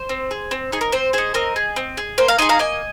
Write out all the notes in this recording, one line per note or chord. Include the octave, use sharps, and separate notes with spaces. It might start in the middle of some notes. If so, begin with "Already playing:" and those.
Already playing: C5
C4
G#4
C4
D#4 G#4
A#4
C4 C5
D#4 G#4 C5
C4 A#4 D#5
G#4
C4
G#4
A#3 C5
F5 A#5
D#4 G#4 G#5 C6
F5 A#5
A#3 D#5 G#5